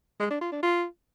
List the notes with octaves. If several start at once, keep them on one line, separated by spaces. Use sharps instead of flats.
G#3
D4
F4
D4
F4